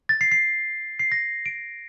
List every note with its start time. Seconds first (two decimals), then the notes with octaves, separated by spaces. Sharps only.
0.09 A6
0.21 C7
0.32 C7
0.99 C7
1.12 A#6
1.46 D7